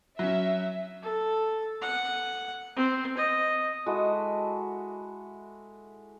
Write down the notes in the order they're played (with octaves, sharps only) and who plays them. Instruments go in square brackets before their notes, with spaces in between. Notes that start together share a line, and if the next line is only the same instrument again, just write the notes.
[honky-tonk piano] F#3 C#4 [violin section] E5
[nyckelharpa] A4
F#5
C4
D#5
[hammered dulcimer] G#3 E4 F#4 A4